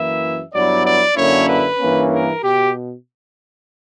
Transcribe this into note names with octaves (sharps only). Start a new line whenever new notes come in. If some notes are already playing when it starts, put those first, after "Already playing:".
Already playing: F#2 E3 A#3 E4 E5
G2 F#3 B3 E4 D5
D5
F#2 D3 A#3 C#4 E4 C#5
B4
G2 E3 A#3 C#4
A#4
B2 G4